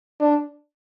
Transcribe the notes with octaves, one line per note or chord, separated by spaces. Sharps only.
D4